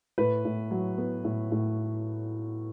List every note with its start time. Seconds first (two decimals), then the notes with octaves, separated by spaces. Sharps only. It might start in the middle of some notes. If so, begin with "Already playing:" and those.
0.18 A2 B4
0.45 A2
0.71 F#3
0.98 B3
1.24 A2
1.51 A2